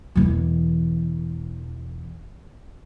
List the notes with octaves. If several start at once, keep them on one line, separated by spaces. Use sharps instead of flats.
E1 E3